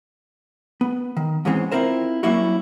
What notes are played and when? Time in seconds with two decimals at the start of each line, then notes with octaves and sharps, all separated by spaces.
0.81 B3
1.17 D#3
1.45 E2 G#2 E3 G#3 C4 C#4
1.72 C4 E4 F4 A#4 C5
2.23 F#3 G3 A#3 C#4 E4 F#4